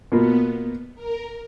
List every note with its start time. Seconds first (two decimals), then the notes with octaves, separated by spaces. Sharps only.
0.12 B2 A#3 B3 F4
0.95 A#4